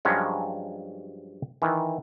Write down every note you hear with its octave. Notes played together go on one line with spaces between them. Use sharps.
G2 F3 F#3 G#3 C#4
D#3 E3